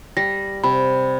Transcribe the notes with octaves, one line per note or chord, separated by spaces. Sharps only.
G3 A#6
C3 B5